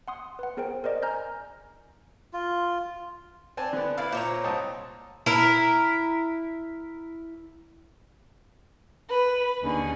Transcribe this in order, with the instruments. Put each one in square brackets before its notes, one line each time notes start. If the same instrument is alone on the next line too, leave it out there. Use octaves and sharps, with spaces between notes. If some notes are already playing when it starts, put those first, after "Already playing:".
[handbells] F#5 C6 D#6
B4 F#5
B3 G#4 A#4 C5 G5
A#4 C5 D5 D#5
G#5 A#5 F6 G6 A#6
[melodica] F4
[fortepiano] C4 G#5 A5 [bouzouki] D4
[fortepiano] D3 B3
[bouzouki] B3 E4 [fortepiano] B4 D5 F5
[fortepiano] A#2 [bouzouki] C5 C#5 A#5
[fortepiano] C2 D#5 A5
[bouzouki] E4 A#4
[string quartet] B4
D#2 D3 C#4 D#4 G#4